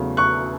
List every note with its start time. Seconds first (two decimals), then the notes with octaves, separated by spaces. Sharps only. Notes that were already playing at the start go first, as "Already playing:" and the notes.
Already playing: E2 C#3 F#3 A3
0.17 C#6 F#6